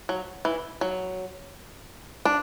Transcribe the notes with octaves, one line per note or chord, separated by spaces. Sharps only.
F#3
E3
F#3
D4